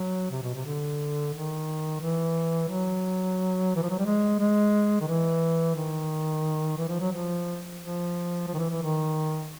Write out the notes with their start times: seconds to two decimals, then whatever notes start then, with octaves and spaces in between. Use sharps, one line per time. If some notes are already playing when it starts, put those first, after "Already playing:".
Already playing: F#3
0.31 C3
0.43 B2
0.54 C3
0.65 D3
1.34 D#3
2.01 E3
2.69 F#3
3.76 E3
3.83 F3
3.90 F#3
3.98 G3
4.06 G#3
4.40 G#3
5.01 D#3
5.08 E3
5.75 D#3
6.77 E3
6.88 F3
7.00 F#3
7.12 F3
7.80 F3
8.47 F3
8.54 D#3
8.58 E3
8.70 E3
8.82 D#3